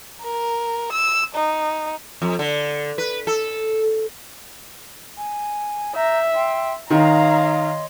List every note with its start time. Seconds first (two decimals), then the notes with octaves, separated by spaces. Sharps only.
0.23 A#4
0.93 E6
1.35 D#4
2.22 F2
2.39 D3
2.98 B4
3.27 A4
5.17 G#5
5.96 E5 A#5 G6
6.34 G5 C6
6.90 D#3 C#5 D#5 F5 A#5 C6